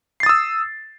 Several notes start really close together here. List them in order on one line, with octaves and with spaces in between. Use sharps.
C7 A6 D#6 E6